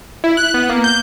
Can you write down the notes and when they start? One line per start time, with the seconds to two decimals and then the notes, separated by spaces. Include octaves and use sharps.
0.24 E4
0.37 F#6
0.54 B3
0.69 A#3
0.84 G6